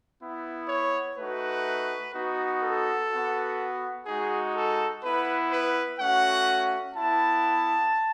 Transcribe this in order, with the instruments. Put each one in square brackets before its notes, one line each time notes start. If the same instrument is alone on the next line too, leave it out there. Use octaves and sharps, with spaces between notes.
[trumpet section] B3 E4
C#5
A3 D#4 F#4 B4
B3 D#4 F#4
A4
B3 F#4
G#3 D#4 F#4 G#4
A4
B3 E4 B4
B4
A3 C#4 F#4 F#5
B3 E4 A5